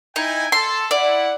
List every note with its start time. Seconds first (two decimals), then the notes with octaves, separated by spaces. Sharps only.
0.16 D#4 E4 G5 G#5
0.52 A4 C6
0.91 E4 D5 F#5